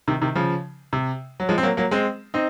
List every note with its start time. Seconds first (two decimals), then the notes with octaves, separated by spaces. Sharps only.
0.08 C3 D#3
0.22 C3 D#3
0.35 C#3 F3
0.93 C3
1.40 F#3
1.49 F3 G#3
1.58 C4
1.63 F#3 A#3
1.77 F#3 A#3
1.91 G#3 C4
2.34 C4 D#4